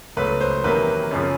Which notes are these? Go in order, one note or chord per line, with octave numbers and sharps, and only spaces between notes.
C#2 B2 F#3 A3 B4
C5
E2 C3 D#3 F#3 A#3 B4
F#2 C#3 F3